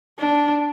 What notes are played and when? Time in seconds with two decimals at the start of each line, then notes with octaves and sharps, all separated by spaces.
0.19 D4